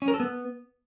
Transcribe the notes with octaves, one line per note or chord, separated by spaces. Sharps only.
C#4
A#4
A4
B3